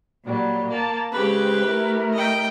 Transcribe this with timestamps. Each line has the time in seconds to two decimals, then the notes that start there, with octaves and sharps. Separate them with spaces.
0.24 A#2 F#3 G3
0.69 A#3 A5
1.12 C#3 G#3 C4 G4 B4
1.67 A3 E4 A#4
2.13 D#5 G5